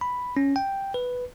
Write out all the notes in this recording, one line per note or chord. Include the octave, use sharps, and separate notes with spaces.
B5
C#4
G5
B4